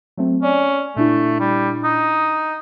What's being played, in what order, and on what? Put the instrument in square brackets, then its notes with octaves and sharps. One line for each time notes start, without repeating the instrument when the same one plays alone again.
[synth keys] F#3 A3 C4
[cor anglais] C#4 [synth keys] D5
[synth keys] A#2 D4 E4 [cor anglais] A3
[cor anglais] G3
D#4